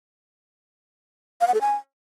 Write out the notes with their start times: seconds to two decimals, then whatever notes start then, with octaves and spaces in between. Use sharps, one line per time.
1.41 F5
1.48 F#5
1.54 A4
1.61 G#5